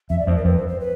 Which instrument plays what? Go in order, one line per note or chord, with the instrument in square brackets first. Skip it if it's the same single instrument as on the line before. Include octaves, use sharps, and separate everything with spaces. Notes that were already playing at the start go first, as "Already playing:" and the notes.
[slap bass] F2 [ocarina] E5
[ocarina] D5
[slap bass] F2 [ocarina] C5
[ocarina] A#4
[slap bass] F2 [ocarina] B4
[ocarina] C5
C5
B4